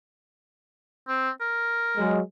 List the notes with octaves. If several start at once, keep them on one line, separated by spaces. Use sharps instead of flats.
C4
A#4
F#3 G#3